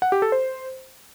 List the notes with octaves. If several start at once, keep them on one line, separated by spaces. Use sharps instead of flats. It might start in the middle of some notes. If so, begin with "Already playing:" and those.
F#5
G4
A4
C5